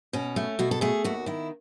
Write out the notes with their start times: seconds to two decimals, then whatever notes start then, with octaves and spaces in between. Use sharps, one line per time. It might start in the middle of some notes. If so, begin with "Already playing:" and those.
0.13 B2 C#4
0.36 A3
0.59 B2 F#4
0.71 A4
0.81 A3 G#4
1.04 D#2 F#4
1.26 D#3 E4